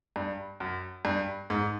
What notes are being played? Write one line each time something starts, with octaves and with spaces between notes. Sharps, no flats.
G2
F#2
G2
G#2